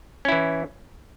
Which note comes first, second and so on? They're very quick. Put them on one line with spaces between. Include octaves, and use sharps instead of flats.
C#4 E4 E3